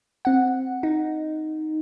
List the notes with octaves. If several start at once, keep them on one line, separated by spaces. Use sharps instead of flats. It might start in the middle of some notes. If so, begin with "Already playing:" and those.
C4 F#5
D#4